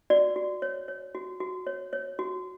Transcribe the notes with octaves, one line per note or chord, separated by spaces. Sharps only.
F#4 D5
F#4
C#5
C#5
F#4
F#4
C#5
C#5
F#4